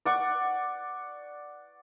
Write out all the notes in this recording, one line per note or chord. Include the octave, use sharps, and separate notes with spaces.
D5 F#5 C#6